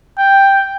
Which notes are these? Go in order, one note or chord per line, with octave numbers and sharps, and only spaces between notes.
G5